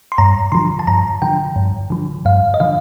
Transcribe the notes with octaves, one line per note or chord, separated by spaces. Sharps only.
C6
G2 A#5
D3 F3 C6
A5
G2 A#5
D3 F3 G5
G2
D3 F3
G2 F5
D#5
D3 F3 F5